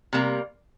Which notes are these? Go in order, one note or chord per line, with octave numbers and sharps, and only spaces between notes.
C3 G3 A#3